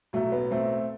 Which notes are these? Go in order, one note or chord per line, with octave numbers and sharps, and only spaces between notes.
B1 A2 F#3 A3
B3
A3 C4